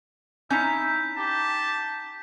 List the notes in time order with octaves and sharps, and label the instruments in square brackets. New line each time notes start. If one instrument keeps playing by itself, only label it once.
[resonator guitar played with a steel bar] C#4 D#4 A#5 [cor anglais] E4 [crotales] G6 B6
[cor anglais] G4 [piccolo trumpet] A5